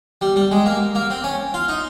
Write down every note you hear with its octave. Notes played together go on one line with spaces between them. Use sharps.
G3
G3
G#3
A#3
A#3
C4
C#4
F4
D#4